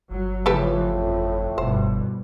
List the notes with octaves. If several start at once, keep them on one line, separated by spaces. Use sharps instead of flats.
G1 F#3
A2 C#3 E3 F3 G4 A4 B4
F2
F#1 G2 B2 C5